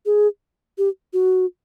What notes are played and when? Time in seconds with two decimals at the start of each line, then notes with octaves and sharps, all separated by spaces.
0.06 G#4
0.78 G4
1.13 F#4